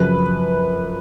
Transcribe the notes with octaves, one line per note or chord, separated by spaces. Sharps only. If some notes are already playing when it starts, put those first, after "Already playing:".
Already playing: F#2 C#3 F3 B4